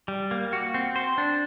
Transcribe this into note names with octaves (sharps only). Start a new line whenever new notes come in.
G3
A#3
F#4
C4
C5
D4